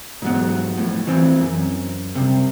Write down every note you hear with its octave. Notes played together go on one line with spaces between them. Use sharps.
G#2 F#3 B3
F2 A2
E3 C4
F#2
C2 C3